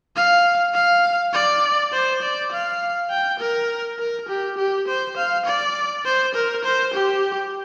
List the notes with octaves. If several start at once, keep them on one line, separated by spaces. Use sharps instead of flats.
F5
F5
D5
C5
D5
F5
G5
A#4
A#4
G4
G4
C5
F5
D5
C5
A#4
C5
G4